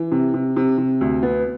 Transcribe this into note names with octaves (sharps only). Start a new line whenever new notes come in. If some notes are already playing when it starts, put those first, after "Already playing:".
Already playing: E3
C3
C3
C3
C3
D2
B3